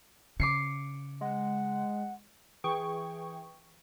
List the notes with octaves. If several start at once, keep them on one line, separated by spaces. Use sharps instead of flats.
C#3 D6 C7 C#7
G#3 F#5
E3 G#4 G5 C#6